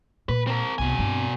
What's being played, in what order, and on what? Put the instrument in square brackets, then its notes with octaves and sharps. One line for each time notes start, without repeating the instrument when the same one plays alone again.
[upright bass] A#2 [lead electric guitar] B4
[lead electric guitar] C4 A#4
[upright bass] C2 B3 [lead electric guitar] B2 G#5
[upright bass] G2 C4